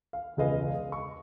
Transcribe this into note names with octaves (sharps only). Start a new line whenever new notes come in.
F5
E1 C#2 G#4 B4 D#5 F5
C#6